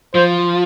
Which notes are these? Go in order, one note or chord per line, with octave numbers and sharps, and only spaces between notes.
F3 C5